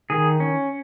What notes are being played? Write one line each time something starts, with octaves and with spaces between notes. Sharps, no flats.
D#3 G#4
C#4